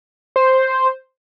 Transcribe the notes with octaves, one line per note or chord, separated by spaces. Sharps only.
C5